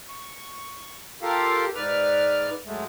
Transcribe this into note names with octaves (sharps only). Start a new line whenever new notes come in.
C#6
F4 G4 A4 A#4 F5
G#2 B4 D5 F6
F#2 G#3 A3